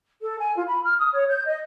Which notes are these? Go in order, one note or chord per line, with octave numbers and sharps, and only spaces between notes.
A4
G#5
F4
B5
F6
D#6
C#5
G6
D#5